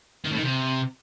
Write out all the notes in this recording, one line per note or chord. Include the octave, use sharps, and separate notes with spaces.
D#3
A2
D#3
C3